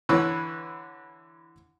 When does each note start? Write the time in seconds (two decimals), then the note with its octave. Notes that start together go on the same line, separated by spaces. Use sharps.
0.09 D3 E3 B4 C#5 D6 E6